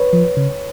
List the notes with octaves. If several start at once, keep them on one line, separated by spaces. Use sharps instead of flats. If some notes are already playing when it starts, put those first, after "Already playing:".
Already playing: B4 C#5
F3
C#3